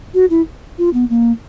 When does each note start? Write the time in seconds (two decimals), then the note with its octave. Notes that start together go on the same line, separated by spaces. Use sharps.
0.14 F#4
0.30 E4
0.78 F4
0.94 B3
1.10 A#3